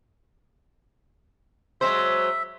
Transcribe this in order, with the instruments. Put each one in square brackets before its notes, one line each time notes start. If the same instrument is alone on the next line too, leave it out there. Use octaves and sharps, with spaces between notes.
[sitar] F#3 G#3 C5 [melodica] E5